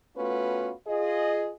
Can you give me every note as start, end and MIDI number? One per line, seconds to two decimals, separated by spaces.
0.17 0.72 57
0.17 0.72 59
0.17 0.72 61
0.17 0.72 65
0.17 0.72 66
0.17 0.72 71
0.87 1.52 65
0.87 1.52 68
0.87 1.52 75